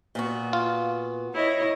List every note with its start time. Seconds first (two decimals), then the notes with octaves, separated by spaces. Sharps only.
0.15 A#2 B3 F#4
0.53 F4
1.35 E4 C#5 D#5